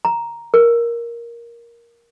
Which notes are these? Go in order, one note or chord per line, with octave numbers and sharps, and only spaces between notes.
A#5
A#4